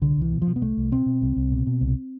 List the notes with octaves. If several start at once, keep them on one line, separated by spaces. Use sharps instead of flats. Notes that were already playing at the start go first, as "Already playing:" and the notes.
C2 D3
C2
E3
B2
F3
B2
B3
C2 A3
C2
B2 C4
B2
C2
C2
B2
B2
C2